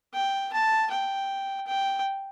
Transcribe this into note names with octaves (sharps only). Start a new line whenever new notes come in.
G5
A5
G5
G5